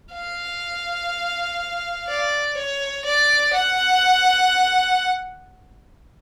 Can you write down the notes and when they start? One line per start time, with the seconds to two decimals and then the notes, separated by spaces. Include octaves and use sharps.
0.14 F5
2.08 D5
2.57 C#5
3.05 D5
3.54 F#5